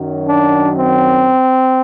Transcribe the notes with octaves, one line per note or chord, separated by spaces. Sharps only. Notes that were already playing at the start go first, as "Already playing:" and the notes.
Already playing: F#2 D#3 F#3
D4
C4